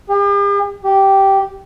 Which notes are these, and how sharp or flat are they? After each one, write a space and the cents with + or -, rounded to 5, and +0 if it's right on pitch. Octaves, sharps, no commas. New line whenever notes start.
G4 +45
G4 -10